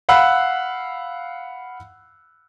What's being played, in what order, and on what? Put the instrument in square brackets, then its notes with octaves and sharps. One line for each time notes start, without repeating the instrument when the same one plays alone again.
[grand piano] F5 F#5 B5 E6 F#6